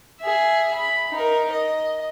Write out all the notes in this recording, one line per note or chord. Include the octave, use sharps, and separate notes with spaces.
G#4 E5
B5
D#4 A#4
D#5